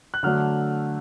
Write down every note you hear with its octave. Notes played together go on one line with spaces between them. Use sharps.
F#6
D3 F#3 A3 D4 F6